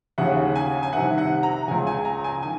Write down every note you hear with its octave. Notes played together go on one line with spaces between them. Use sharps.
D#2 C#3 F#5
G#5
G#5
C2 C3 D#3 F#5
F#5
A#5
C#2 C#3 G#5
G#5
A#5
G#5
D#3 G#5